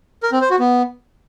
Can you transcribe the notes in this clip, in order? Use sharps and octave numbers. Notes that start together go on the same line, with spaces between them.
A#4
C4
C5
F#4
B3